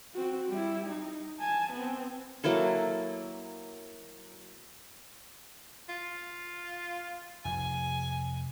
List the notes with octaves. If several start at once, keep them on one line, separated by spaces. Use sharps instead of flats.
C4 F#4
G3 E4
D#4
G#5 A5
B3 C4
F#3 A#3 E4 A4
F4
F1 G#5